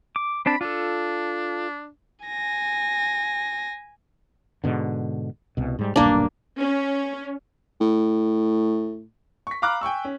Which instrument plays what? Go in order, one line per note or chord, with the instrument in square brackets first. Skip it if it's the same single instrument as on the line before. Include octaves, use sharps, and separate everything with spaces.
[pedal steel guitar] D6
[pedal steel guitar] C4 D4 A5 [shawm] B5
[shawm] D4 [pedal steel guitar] F4 A4
[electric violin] G#5 A#6
[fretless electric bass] G#2 B2 D3
C2 B2
G#2 G3
[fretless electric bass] D#1 B1 G2 [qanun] A#3 D4
[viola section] C#4
[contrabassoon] A2
[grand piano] C#6 B6
F5 A#5 B5 D6 F6 F#6
G5 G#5 C#6 E6
C#4